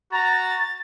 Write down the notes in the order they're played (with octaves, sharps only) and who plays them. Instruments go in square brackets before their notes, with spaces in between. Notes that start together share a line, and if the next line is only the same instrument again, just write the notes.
[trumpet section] F#4 A#5 [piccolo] A6